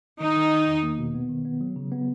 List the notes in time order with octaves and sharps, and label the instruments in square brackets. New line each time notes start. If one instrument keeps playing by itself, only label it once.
[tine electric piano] D#3 [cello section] D#4
[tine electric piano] D#3
D#3
E2
A#3
B2
B3
D#3
B3
F#3
C#3
B3